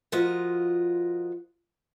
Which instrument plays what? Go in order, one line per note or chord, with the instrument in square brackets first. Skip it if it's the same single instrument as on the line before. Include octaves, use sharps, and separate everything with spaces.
[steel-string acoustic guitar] F3 F4 F#4 A#4 D#5